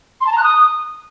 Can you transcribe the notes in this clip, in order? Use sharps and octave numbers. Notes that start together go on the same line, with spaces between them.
C6
A5
A#5
F#6
D#6